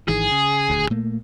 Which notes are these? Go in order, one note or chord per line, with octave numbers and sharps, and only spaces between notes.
G#1 D#3 E3 G#4
C#3
D#1 D2
A#2 A3 A#3